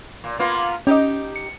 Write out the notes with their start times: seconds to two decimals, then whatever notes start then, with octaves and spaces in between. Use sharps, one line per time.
0.24 A#2
0.39 A#3 B3 F4
0.87 C#4 D#4 G4 D#5
1.36 C#7